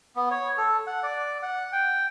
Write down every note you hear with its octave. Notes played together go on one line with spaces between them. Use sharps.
B3
C#5
A4
F#5
D5
F#5
G5